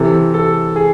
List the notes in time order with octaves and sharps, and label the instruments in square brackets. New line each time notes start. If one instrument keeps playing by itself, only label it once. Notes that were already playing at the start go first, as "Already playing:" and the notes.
Already playing: [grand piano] C3 E3 A4
A4
G#4